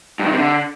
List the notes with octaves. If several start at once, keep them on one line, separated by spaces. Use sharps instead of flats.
G2
D#3
C3
D3